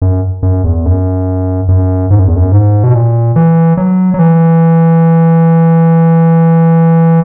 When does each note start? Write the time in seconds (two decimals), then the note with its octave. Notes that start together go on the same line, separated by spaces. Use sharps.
0.02 F#2
0.43 F#2
0.64 E2
0.86 F#2
1.68 F#2
2.10 G#2
2.19 F#2
2.28 E2
2.36 F#2
2.52 G#2
2.84 B2
2.94 A#2
3.36 E3
3.77 F#3
4.14 F#3
4.19 E3